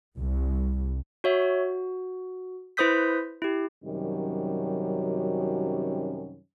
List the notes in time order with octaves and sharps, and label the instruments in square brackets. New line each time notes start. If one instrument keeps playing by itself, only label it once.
[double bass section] C2
[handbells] F#4 C#5 E5
F#4
E4 B4 C5 D#6 G6 B6
E4 G4
[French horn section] F#2 C3 D#3 F#3 G3 C#4